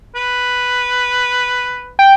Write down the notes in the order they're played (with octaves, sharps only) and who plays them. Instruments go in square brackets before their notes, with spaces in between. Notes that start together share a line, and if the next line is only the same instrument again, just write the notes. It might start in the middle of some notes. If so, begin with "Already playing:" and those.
[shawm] B4
[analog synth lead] G5